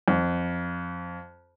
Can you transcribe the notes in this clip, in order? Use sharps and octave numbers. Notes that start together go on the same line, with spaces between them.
F2